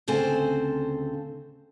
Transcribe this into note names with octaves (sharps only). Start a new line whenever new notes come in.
D2 C#3 C4 A4 C5 G#5